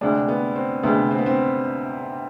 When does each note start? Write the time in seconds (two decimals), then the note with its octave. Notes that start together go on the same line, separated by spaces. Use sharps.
0.01 D2 C3 G#3 D4
0.28 B3
0.56 C4
0.83 D2 C3 G#3 B3
1.11 C4
1.18 B3
1.26 C4